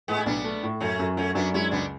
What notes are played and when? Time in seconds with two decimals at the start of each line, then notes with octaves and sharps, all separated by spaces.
0.08 A2 G#3 B3
0.18 E4
0.26 B1 B3 D4
0.44 A3
0.63 A2
0.80 F#2 A3 C#4
0.99 F#2
1.17 F#3 A3 C#4
1.35 F#2 B3 D4
1.54 G#3 C#4 E4
1.71 C#2 B3 D4